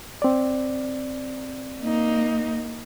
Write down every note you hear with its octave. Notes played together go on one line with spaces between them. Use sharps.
C4 D5
A#3 D#4